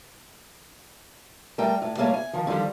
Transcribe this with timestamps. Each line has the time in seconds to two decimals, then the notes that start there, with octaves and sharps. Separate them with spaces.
1.58 G3 A3 A#4 G5
1.82 A2
1.97 G3 A3 A#3 G#4 C#5
2.14 G#5
2.33 D#3 F3
2.47 D3 D#3 F3 G3